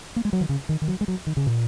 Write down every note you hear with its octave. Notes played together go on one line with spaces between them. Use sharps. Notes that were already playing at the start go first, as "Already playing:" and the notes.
A#3
G#3
F#3
D#3
C#3
D#3
D#3
F#3
G#3
F#3
D#3
C#3
A#2